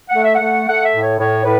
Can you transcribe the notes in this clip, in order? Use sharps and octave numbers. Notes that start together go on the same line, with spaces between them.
A3 F#5
E5
F#5
A3
A3 F#5
E5
A2
C#5
A2 C#5
A2 B4